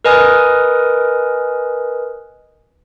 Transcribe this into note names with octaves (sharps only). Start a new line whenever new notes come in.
A#4 B4 D#5 G#5 D#6 F6